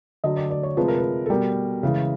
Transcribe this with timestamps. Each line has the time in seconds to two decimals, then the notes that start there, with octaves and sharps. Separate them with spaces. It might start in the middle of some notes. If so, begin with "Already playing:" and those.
0.24 D3 F#3 D#5
0.37 D5
0.51 D5
0.63 C#5
0.77 C3 F3 G#3 B4
0.88 A#4
0.98 B4
1.26 A4
1.30 B2 G3 A#4
1.83 C#3 E3 G#3